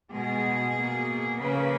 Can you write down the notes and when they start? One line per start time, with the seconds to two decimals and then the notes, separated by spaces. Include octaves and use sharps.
0.12 B2 G#3 G#4
0.75 B2 A#3
1.38 C#3 F3 A#3 B4